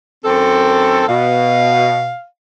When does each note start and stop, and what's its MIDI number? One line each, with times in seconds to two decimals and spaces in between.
0.24 1.05 42
0.24 1.05 51
0.24 1.05 60
0.24 1.05 69
1.08 2.12 47
1.08 2.25 77